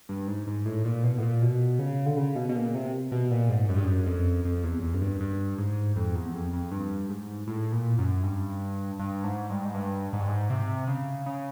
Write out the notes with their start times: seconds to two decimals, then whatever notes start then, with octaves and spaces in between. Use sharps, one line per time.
0.09 G2
0.28 G#2
0.47 G#2
0.65 A2
0.85 A#2
1.04 B2
1.18 A2
1.23 A#2
1.42 B2
1.79 C#3
2.06 D3
2.17 C#3
2.36 B2
2.49 B2
2.56 A#2
2.75 C3
3.11 B2
3.31 A#2
3.49 G#2
3.69 F#2
3.76 G2
3.84 F#2
4.06 F2
4.45 F2
4.63 E2
4.82 E2
4.94 F#2
5.01 G2
5.20 G2
5.58 G#2
5.96 F2
6.15 E2
6.34 F2
6.53 F2
6.71 G2
7.09 G#2
7.47 A2
7.72 A#2
7.98 F#2
8.23 G2
8.99 G2
9.24 G#2
9.50 G2
9.65 G#2
9.74 G2
10.13 G#2
10.20 G2
10.28 G#2
10.50 C3
10.88 C#3
11.26 C#3